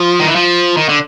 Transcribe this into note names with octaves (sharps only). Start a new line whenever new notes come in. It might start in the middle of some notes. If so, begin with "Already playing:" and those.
Already playing: F3
D#3
E3
F3
D#3
D3